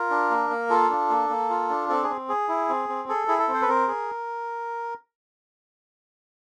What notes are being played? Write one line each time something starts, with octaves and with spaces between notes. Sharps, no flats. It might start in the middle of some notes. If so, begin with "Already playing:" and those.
Already playing: F4 A#4
D4
A#3
A#3
F4 A4
D4
A#3
A#3
F4
D4
C4 A4
G#4
C4
G#4
E4
C4
C4
G#4 A4
E4 G#4
A4
C4
C5
B4
C4 A#4
G#4